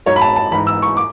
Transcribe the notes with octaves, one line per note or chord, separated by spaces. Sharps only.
G#2 F#3 C#5
B5
A5
A5
G#2 E3 B5
E6
C#6
D6